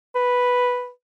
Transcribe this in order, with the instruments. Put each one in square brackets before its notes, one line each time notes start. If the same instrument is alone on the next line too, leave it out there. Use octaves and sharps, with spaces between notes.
[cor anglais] B4